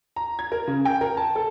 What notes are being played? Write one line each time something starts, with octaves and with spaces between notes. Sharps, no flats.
A#5
G#6
A#4
C#3
G5
A#4
A5
A4